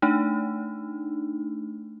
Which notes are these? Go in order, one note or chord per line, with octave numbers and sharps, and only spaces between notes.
A3 D4 D#4